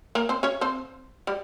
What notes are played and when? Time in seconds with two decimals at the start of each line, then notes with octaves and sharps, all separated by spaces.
0.15 A#3 A#4
0.29 C4 C5
0.43 C#4 C#5
0.61 C4 C5
1.27 G3 G4